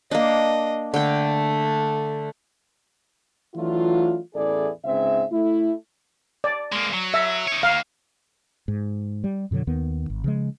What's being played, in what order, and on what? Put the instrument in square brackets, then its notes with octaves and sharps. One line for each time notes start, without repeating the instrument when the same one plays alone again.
[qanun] A#3 D4 [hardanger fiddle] D#5
[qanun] D3 G5 [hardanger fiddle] A3
[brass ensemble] E3 F#3 A3 D4 E4 F4
A1 E2 E4 G#4 A4 D5
C#2 G#2 C4 G#4 E5
A3 E4
[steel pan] D5
[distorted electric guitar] G#3 A#3
F#3
[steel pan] E5
[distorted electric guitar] D#4 C#5
[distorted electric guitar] D#3 A#3 [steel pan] F5
[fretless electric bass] G#2
G3
F#2 B2 D3 F#3
D#2 D#3 B3
G#1
C#3 F3 G#3